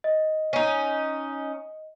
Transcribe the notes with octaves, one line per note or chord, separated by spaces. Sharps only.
D#5
C#4 D#4